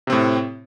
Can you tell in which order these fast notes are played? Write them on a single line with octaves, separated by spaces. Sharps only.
C3 C4 A2